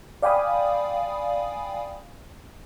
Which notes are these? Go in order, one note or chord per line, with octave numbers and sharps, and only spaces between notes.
D5 F5 G5 G#5 B5 D#6